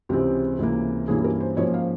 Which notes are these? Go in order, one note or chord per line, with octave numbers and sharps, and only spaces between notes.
C#2 C3 E3 G#3 C4 G4
C#2 C3 E3 A#3
G2 E3 A#3 C#4 G#4
A#4
C5
G#2 F3 A#3 C#4 C#5
F5